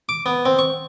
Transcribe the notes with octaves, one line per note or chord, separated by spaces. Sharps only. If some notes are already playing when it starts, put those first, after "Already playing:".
D6
B3
C4
C#6